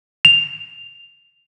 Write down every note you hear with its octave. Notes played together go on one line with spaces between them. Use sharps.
F7